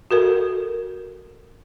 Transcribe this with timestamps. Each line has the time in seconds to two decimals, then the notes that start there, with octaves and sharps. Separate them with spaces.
0.11 F#4 A4 A#4